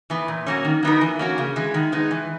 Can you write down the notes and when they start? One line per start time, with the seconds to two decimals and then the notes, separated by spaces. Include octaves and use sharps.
0.10 E3 B3
0.28 A#2
0.46 F#3 A#3 C#4
0.65 D#3
0.83 F#3 B3 D#4 A#4
1.01 E3
1.19 A#3 C#4 F#4
1.38 C#3
1.56 E3 G#3
1.74 D#3
1.92 G#3 B3 D#4
2.11 E3